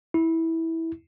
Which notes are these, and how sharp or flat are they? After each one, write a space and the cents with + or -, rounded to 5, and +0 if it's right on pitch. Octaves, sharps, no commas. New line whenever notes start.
E4 -15